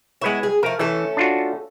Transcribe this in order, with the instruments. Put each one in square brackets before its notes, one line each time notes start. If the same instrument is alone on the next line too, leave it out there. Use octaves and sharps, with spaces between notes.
[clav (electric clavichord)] G#3 B4 C#5 [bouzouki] B3 E4
[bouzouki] G#4
[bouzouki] F3 A3 [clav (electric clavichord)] A#4
[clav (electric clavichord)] E3 [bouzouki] A3 C#4 A4
[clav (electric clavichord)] D4 F4 F#4